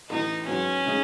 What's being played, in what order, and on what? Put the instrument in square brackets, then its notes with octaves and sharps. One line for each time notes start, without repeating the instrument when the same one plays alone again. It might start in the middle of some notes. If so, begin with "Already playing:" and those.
[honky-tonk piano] A1 A2 E3 [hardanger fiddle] D#4
[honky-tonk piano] G#2 F#3 B3 [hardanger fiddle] C#4
[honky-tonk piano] C#3 G#3 D#4 G#4